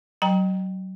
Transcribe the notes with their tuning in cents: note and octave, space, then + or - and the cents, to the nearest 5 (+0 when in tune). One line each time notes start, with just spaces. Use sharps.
F#3 +30 G5 +0 A#5 +10